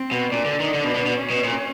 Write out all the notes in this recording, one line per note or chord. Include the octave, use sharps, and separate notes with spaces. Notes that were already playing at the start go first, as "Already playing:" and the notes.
Already playing: C4
B2
A#2 D4
D3
D#3
D3
B2
B2
B2
C#4
B2
A#2